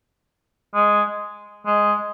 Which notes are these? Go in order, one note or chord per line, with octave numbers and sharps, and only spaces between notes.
G#3
G#3